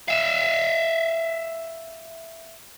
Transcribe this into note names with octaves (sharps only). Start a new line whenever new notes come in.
E5 F5